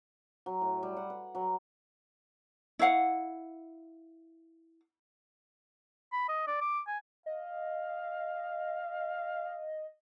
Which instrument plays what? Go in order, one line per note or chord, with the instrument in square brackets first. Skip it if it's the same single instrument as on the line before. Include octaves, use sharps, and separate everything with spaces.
[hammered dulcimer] F#3
A2
G3
F#5
B4
F#3
[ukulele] E4 C#5 F5 F#5
[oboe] B5
D#5
D5
D6
G#5
[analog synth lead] D#5 [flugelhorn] F5